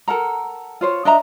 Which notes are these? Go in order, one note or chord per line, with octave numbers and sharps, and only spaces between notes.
A4 A#4 F#5 A#5
F4 C5 C#5
D4 D#5 E5 A#5